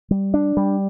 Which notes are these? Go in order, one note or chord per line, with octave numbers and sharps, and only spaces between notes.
G3
D4
G3